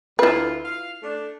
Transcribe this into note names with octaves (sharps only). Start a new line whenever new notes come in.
D2 E4 F4 B4
F5
A3 D4